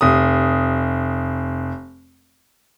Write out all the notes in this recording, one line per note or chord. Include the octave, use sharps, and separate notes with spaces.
F1 D#6